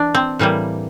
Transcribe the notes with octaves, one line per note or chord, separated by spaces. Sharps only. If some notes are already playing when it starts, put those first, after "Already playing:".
Already playing: E3 D4
C4
A2 E3 G3 A#3